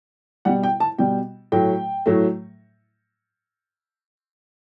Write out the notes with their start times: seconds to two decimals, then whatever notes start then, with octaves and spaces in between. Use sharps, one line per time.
0.45 B2 G3 F#5
0.63 G5
0.80 A5
0.99 B2 G3 G5
1.52 A2 F#3 A3 G5
2.06 A2 F#3 A3